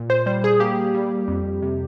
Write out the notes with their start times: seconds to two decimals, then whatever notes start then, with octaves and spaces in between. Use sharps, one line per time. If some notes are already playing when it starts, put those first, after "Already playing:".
Already playing: A#2
0.10 C5
0.26 G3 C5
0.44 G#4
0.60 A#3 G4
0.94 G3
1.28 F2
1.62 C3